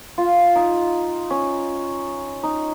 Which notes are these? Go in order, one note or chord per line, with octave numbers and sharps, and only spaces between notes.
F4
D#4
C#4
D#4